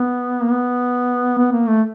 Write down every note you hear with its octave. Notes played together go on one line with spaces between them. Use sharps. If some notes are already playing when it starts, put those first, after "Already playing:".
Already playing: B3
A#3
B3
B3
A#3
A3